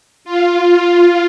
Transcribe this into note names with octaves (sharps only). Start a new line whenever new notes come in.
F4
F4